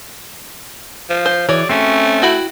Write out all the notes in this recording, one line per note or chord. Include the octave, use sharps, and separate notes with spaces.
F3
C5
E3 F#4 G#4 C#5 D5
A3 C4 C#4
E4 F#4 G5